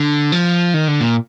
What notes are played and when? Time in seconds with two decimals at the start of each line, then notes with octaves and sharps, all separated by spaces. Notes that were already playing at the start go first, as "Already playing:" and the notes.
Already playing: D3
0.32 F3
0.74 D#3
0.88 D3
1.01 A#2